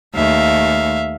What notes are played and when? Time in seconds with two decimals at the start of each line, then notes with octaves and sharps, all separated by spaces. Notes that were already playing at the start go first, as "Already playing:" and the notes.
0.15 D#2 A3 E5 F5